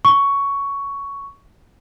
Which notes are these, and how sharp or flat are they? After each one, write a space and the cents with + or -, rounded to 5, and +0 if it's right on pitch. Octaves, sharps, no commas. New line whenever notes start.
C#6 +10